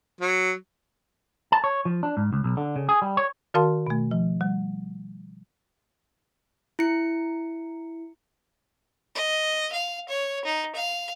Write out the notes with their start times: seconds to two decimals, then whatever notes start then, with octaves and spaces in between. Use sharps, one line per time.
0.21 F#3
1.52 A5
1.64 C#5
1.85 F3
2.03 D4
2.17 G#2
2.33 C#2
2.44 B1
2.57 D3
2.76 C#3
2.89 G#4
3.02 G3
3.17 C#5
3.54 D#3 F#4 A#4 F5 A5 C6
3.87 B2 A3
4.11 F3
4.41 G3
6.79 E4 C#7
9.15 D#5
9.72 F5
10.09 C#5
10.45 D#4
10.75 F5